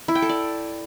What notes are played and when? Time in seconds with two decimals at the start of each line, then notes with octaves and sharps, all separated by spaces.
0.08 E4
0.15 G5
0.22 A4
0.29 D5